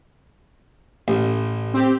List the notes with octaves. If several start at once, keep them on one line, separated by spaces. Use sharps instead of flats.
A1
C4 G4